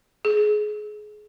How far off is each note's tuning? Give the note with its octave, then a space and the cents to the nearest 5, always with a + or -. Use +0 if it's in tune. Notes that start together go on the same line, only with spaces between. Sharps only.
G#4 +25